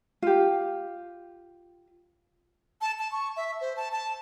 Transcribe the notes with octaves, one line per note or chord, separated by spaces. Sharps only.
F4 G4
A5
A5
C#6
E5
C5
A5
A5